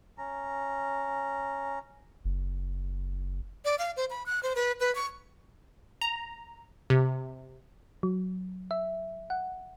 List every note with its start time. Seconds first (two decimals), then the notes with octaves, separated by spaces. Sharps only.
0.18 C#4 A#5
2.25 F#1
3.65 D5
3.79 F5
3.97 C5
4.10 B5
4.26 F#6
4.43 C5
4.56 B4
4.80 B4
4.95 C#6
6.01 A#5
6.90 C3
8.03 F#3
8.71 E5
9.30 F#5